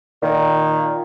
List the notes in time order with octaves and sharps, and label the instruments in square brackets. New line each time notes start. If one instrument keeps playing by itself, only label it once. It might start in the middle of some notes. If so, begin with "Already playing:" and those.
[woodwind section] A#2 D#3